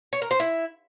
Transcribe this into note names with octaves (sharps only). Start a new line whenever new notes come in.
C#5
A#4
C5
E4